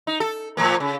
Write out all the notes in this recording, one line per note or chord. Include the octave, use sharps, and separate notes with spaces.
D#4
A4
A2 F3 A#3
C#3